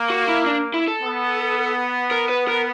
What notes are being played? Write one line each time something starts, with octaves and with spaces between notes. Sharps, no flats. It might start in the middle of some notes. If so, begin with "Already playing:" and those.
Already playing: A#3
F#4
E4
D4
E4
A4
B3
A#4
B4
A#4